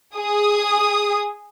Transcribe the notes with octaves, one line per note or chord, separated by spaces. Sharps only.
G#4 D#6